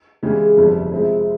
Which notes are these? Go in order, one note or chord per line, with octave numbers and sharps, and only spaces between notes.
C#3 E3 G#3 C#4 G4
G1 F2 C3 G3
C3 F3 G#3 C4 E4